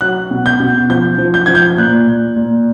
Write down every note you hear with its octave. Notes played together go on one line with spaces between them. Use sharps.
F#3 F#6
B2
G6
B2
F3 G6
F3
G6
F3 G#6
G6
A#2 F#6
A#2
A#2